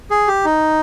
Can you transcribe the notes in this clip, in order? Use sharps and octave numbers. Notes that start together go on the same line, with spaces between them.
G#4
G4
D#4